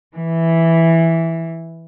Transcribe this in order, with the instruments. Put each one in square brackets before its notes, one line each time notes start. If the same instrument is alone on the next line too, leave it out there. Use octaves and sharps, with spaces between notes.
[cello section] E3